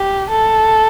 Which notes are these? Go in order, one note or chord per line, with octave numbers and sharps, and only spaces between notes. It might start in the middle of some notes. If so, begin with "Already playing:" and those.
Already playing: G4
A4